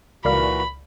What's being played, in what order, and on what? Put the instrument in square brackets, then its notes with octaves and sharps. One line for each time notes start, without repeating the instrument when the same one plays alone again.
[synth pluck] C#2 D5 F5 [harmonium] A#2 E3 F#4 [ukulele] A#4 [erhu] B5